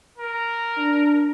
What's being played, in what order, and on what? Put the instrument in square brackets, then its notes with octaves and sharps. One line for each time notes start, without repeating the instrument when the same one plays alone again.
[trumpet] A#4
[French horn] D4